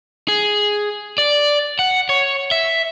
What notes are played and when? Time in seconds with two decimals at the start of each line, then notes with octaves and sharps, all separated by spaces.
0.28 G#4
1.18 D5
1.79 F#5
2.09 C#5
2.51 E5